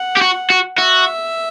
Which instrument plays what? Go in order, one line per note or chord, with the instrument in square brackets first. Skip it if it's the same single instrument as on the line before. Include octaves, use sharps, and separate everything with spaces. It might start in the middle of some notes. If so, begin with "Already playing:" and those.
Already playing: [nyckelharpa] F#5
[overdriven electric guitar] G4
F#4
F#4
[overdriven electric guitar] F#4 [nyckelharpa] E5